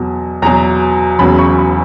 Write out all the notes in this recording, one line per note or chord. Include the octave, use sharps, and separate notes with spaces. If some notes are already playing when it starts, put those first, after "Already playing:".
Already playing: E2 B2 F#3
E2 B2 F#3 A#5
E1 E2 C#3 F#3 B5
C#6
B5